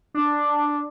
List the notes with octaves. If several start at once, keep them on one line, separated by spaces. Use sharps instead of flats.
D4